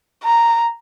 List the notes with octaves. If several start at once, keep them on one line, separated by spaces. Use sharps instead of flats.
A#5